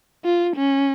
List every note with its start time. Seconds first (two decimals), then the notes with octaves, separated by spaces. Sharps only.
0.25 F4
0.57 C#4